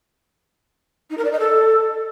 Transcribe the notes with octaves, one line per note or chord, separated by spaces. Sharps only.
D#4
A#4
D5
D#5
A4